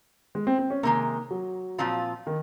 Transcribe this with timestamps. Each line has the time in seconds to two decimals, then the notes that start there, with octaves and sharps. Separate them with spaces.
0.35 G#3
0.47 C4
0.59 C4
0.70 C#4
0.83 C3 D#3 G#3 A#3
1.31 F#3
1.78 A#2 F3 C4 F4
2.27 D#3